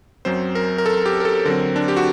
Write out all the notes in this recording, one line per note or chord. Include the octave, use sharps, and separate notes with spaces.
F#2 F#3 C4 C5
A#4
A#4
A4
G4
A#4
A4
D3 F#3 C4 A#4
D4
G4
F#4